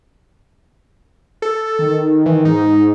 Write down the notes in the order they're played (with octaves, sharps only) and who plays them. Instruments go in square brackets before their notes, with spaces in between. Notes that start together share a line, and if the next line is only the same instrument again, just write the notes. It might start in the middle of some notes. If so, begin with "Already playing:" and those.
[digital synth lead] A4
[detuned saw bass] D#3
[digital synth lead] E3
[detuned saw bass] G#2 [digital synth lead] D#4